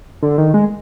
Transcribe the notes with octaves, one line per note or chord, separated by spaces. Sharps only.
D3
D#3
G#3